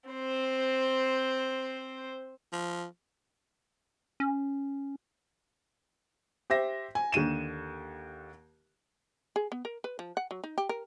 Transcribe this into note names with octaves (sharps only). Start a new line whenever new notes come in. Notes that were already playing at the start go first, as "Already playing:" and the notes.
C4 C5
F3
C#4
G4 C5 E5 A#6
G#5
D#2 D3 D#7 E7
G#4
B3
A#4
B4
F3
F#5
F#3
D#4
G4
A#4